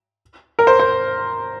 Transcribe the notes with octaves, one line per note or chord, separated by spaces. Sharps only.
A#4
C5
C5